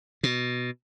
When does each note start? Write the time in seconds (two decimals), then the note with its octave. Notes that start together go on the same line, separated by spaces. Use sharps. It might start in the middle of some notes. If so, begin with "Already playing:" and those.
0.23 B2